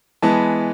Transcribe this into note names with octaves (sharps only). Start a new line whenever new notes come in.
E3 G#3 B3 A5